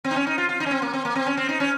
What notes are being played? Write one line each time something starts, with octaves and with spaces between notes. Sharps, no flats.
C4
D#4
C#4
D#4
F4
F4
D#4
C#4
C4
A#3
C4
A#3
C4
C#4
C4
D#4
C#4